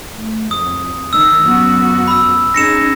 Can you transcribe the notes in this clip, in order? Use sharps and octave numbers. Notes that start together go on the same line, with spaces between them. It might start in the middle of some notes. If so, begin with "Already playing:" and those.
A3
F2 D#6
D#3 E6
F#2 B3 F#4
B5 E6
C#4 D#4 G#4 A#6 C#7 E7